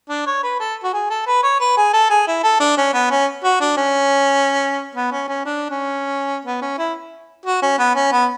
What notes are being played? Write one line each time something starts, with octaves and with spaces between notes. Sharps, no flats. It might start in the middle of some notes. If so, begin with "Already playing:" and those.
D4
C#5
B4
A4
F#4
G#4
A4
B4
C#5
B4
G#4
A4
G#4
E4
A4
D4
C#4
B3
C#4
F#4
D4
C#4
B3
C#4
C#4
D4
C#4
B3
C#4
E4
F#4
C#4
B3
C#4
B3